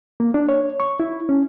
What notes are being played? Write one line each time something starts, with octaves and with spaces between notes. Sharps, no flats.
A#3
D4
C#5
C#6
E4
C#4